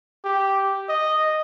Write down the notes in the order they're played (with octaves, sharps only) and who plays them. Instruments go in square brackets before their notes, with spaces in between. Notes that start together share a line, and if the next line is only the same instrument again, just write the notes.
[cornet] G4
D#5